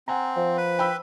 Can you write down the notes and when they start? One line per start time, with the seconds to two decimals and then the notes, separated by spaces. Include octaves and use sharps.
0.08 C4 F#5 G#5 A#5
0.36 F3
0.57 B4
0.79 G5 B5 E6